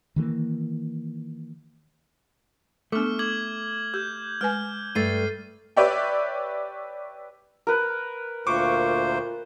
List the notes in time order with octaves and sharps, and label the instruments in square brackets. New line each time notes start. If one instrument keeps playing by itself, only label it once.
[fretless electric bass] D#3 E3 G#3 A#3
[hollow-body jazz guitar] A3 [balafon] B3 D4 A4 [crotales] D6 F6
[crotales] D6 G#6 F#7
[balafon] G4 [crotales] G6
[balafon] G#3 B4 G#5 [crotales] F6
[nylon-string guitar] G2 A3 [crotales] A6 C7 D#7
[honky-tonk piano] G4 B4 C#5 D5 E5 G5
[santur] A#4 B4
[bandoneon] D2 A#2 C5 [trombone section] F4 [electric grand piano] C#6 D6